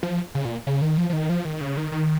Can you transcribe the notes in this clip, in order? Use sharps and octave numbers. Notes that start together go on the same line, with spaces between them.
F3
C#3
A#2
C#3
D#3
F3
F3
D#3
F3
D#3
C#3
D#3
D#3